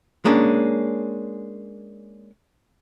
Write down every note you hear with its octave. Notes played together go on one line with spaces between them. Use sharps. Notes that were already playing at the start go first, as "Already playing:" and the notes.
G#3 A#3 C#4 D4